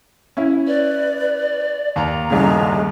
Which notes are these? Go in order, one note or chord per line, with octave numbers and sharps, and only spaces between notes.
C#4 E4
B4 D5
D#2 A#5
G1 C2 C#3 G#3